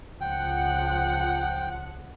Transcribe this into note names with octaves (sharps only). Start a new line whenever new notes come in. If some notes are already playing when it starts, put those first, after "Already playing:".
C#2 F3 F#5 G5